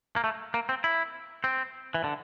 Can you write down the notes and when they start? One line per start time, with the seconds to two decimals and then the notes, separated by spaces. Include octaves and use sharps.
0.16 A#3
0.24 A3
0.54 A#3
0.69 C4
0.84 E4
1.44 C4
1.94 E3
2.04 D3